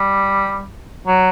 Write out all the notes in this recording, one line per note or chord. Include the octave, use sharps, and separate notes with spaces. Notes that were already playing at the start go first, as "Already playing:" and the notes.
Already playing: G3
F#3